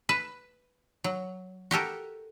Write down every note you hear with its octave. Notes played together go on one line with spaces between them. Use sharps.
B4
F#3
F#4 G4 A4 A#4